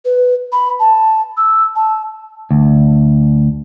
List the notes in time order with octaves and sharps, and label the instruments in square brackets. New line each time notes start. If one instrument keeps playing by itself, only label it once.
[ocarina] B4
B5
A5
E6
A5
[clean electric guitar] D2